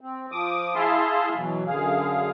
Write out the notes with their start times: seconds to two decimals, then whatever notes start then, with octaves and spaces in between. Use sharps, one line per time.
0.01 C4
0.32 F3 D6 D#6
0.75 E4 G#4 E5 F5 A5 C6
1.36 B2 E3 F#3
1.67 F#2 D3 G#4 F5